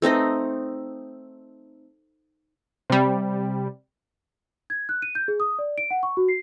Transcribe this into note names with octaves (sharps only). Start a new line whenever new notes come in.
A3 C4 D#4 D#5
C3 G3
G#6
F#6
D#7
G6
G#4
D#6
D5
D7
F#5
C#6
F#4
C7